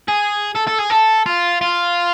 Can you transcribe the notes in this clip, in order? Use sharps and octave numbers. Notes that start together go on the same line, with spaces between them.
G#4
A4
A4
G#4
A4
F4
F4